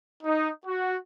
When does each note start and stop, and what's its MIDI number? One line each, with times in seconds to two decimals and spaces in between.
0.24 0.50 63
0.66 0.96 66